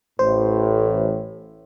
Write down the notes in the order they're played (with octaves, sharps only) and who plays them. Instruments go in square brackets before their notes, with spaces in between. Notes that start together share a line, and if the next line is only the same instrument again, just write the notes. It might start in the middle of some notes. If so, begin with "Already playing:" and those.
[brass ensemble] A1 A2 [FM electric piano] C5